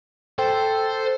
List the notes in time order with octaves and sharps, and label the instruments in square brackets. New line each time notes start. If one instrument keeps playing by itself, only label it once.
[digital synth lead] A4 [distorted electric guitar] C5 [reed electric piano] G5